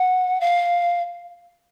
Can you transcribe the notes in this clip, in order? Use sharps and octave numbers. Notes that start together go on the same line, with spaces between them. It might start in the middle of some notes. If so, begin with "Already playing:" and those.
Already playing: F#5
F5